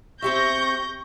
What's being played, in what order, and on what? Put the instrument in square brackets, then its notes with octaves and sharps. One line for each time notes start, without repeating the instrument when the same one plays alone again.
[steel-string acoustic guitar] C4 G4 E5 [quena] C#6 [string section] G6 A#6